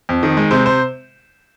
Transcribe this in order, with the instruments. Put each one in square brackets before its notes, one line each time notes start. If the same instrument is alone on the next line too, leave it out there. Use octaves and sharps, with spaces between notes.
[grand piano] F2
D#3
G#3
C3 C5
C5